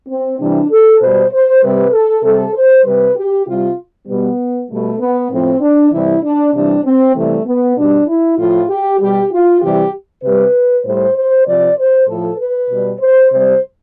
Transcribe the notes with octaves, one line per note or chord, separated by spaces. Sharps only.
C4
C3 E3 G3 D4
A4
B2 G3 C5
C5
C3 G3 B4
A4
C3 G3 A4
C5
C3 G3 B4
G4
C3 G3 F4
B2 G3 B3
B2 G3 A3
B3
A2 F3 C4
D4
C3 E3 G3 E4
D4
C3 E3 G3 D4
C4
C3 E3 G3 A3
B3
B2 G3 D4
E4
A2 F3 F4
G4
B2 G3 G4
F4
C3 E3 G3 G4
C3 G3 B4
A2 G3 C5
C5
C3 F3 D5
C5
A2 F3 A4
B4
B2 G3
C5
C3 G3 C5